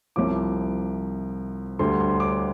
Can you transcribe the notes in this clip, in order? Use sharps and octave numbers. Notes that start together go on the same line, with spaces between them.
C2 C3 F3 D6
D2 D3 G3 C6
C6
D6